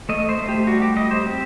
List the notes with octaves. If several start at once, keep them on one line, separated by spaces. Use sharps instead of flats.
A3 D#5
C5
A3
G4
G3 F#4
G4
G3 D#5
C5
C4 G4